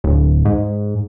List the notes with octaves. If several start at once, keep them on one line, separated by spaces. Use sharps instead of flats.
D1
G#2